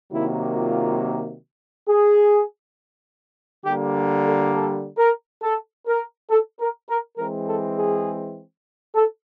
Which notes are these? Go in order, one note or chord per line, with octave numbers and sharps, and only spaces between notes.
C3 D#3 F#3 A#3 E4
F4
G#4
D3 G3 A#3 G4
A4
A4
A#4
A4
A#4
A4
A#4
A#4
E3 G#3 C4 A#4
A4
G#4
A4